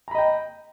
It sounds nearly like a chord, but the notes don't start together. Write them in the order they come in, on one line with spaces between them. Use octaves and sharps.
A#5 B5 D#5 G5